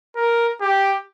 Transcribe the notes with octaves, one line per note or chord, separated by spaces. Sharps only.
A#4
G4